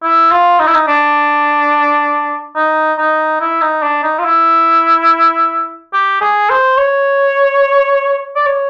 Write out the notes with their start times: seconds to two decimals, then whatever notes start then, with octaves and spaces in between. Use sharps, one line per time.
0.03 E4
0.31 F4
0.59 D#4
0.67 E4
0.75 D#4
0.87 D4
2.56 D#4
2.98 D#4
3.41 E4
3.62 D#4
3.83 D4
4.03 D#4
4.19 F4
4.24 E4
5.93 G4
6.21 G#4
6.50 C5
6.78 C#5
8.36 D5
8.46 C#5